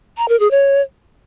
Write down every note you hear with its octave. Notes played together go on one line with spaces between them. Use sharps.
A#5
A#4
G#4
C#5